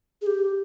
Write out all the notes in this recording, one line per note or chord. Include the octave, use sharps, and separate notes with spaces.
G#4
G4